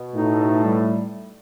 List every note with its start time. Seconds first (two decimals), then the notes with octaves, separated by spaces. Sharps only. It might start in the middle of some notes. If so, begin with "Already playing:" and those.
Already playing: B2
0.15 A2 A3 D#4
0.39 B2
0.63 G3